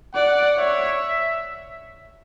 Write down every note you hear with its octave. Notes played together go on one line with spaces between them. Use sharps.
D5 F#5
C#5 E5